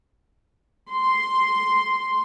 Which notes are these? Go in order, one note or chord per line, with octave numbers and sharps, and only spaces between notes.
C6